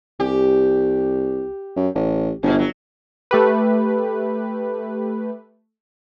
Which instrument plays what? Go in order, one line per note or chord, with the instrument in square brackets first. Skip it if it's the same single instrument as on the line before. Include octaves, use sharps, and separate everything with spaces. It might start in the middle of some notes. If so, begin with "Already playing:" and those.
[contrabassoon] C2 [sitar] G4
[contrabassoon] F#2
A1
[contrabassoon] G1 [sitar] G#2 B2
[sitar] F#3
[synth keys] A3 G4 B4